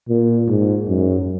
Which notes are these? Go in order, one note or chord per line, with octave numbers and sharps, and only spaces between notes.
A#2
G#2
F#2